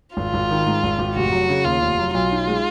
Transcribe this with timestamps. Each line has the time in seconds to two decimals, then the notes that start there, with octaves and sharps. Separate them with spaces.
0.16 G#1 F4
0.34 G#1
0.50 D#3
0.66 G#2
0.83 G#1
0.99 G#1
1.15 F1 F#4
1.32 F#3
1.49 C#3
1.65 D#2 F4
1.82 F1
1.98 F#3
2.14 B1 F4
2.32 D#4
2.47 G#3